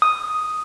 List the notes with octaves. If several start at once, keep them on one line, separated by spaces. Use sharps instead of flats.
D#6